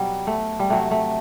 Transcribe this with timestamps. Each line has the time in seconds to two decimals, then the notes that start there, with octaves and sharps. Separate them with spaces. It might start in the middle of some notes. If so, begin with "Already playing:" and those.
Already playing: B2 F#3 G3 B3
0.27 A3
0.59 G3
0.70 C3 F#3 A3
0.91 A3